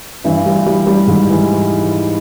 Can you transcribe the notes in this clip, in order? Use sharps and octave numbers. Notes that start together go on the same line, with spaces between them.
G2 E3 E4
G3
G3
G3
G#2
E3